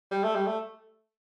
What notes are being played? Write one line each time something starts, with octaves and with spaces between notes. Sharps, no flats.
G3
A3
G3
A3